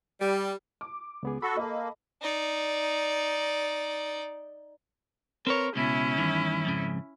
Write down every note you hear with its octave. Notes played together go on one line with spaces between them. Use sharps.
G3
D6
C#2 B3 G#4
F#4 A4 B5
A#3 A4 D#5
D#4 D5
C4 A#4 B4 C#5
C#2 B2 C#4 E4
E2 G2 D#3
F2 G#2 C#3